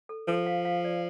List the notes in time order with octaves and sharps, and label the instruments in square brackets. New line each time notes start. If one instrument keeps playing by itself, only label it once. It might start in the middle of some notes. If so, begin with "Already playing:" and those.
[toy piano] A4
[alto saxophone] F3 [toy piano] A4
[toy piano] F5
F5
D5